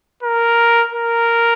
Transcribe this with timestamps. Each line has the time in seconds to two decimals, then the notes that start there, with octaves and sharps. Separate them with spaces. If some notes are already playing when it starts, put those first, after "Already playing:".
0.23 A#4
0.92 A#4